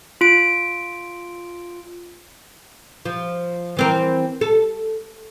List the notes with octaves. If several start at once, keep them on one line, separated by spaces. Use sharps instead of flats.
F4 D7
F3
E3 C4 A#4
A4